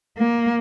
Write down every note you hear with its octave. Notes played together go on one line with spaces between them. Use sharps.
A#3